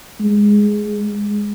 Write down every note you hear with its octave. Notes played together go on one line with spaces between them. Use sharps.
G#3